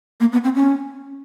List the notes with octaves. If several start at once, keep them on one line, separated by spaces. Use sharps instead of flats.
A#3
B3
C4
C#4